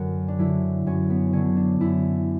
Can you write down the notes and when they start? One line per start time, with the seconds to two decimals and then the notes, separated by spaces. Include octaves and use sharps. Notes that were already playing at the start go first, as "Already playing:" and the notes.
Already playing: F#2 D3 F#3 F#4 A#4
0.28 D4
0.39 D3 F#3 E4
0.86 F#2 C#4
1.10 B3
1.33 D3 F#3 C#4
1.56 D4
1.80 F#2 E4